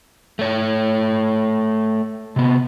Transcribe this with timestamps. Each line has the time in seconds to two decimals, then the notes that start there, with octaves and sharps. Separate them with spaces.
0.39 A3 C#5
2.36 C3 B3